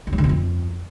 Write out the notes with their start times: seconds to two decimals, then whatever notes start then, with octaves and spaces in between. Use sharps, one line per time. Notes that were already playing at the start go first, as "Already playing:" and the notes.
0.07 E3
0.13 F#3
0.18 D3
0.24 B2
0.29 F2